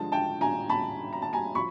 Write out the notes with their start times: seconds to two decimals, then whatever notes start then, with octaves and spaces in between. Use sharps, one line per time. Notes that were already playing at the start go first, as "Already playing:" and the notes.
Already playing: G2 D3 F3 G#3 A5
0.12 G5 A5
0.41 G#5 A#5
0.69 A5 B5
1.13 A#5
1.22 A5
1.33 G#5 A#5
1.55 F3 B5 C#6